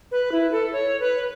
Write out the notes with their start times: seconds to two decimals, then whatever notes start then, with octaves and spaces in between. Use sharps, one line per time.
0.12 B4
0.32 E4
0.52 A4
0.73 C#5
1.00 B4